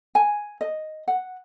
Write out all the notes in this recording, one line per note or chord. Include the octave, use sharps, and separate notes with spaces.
G#5
D#5
F#5